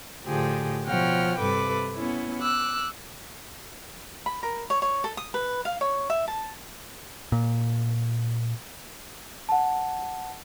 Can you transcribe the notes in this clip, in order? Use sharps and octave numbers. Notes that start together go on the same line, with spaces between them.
A2 D3 F3 G4 G#4
B2 F3 C#5 F#5 G5 F6
G2 C3 A4 B4 D6
B3 C#4 E4
D6 E6 F#6
B5
A#4
C#5
C#5
A4
D#6
B4
F5
C#5
E5
A5
A#2
F#5 A5